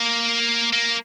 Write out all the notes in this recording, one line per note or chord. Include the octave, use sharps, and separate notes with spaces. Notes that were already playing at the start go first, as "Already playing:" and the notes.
Already playing: A#3
A#3